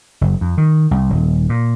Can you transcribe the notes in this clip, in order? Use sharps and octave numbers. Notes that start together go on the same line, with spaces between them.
F#1
F2
D#3
C2
D#1
A#2